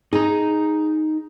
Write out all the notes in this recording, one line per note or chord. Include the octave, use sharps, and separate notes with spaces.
D#4 G#4 A#5